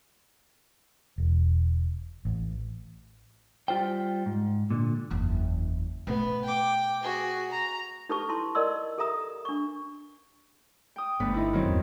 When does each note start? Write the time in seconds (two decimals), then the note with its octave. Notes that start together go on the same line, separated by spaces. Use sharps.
1.18 E1
2.25 A1
3.68 G3 F4 C5 G5
4.26 G#2
4.71 A#2 D3
5.10 F#1 E2
6.07 B2 A3 B3
6.44 G5 D6
7.03 F#4 G#4
7.51 A#5
8.09 D#4 G4 A4 B4 A5 C#6
8.29 E4 A5 C6
8.55 A#4 D5 D#5 C6 E6
8.98 G4 A4 A#4 E5 A#5 D#6
9.45 D4 C#6
10.96 G5 D#6
11.20 G1 D2 B3 B4
11.34 D#4 E4
11.53 D#3 F#3 C4
11.65 D#1 F#2